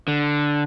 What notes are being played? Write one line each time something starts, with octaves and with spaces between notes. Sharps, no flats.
D3